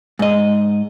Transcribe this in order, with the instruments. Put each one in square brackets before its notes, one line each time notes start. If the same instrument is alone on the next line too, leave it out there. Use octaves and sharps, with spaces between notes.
[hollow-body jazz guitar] G#2 D#5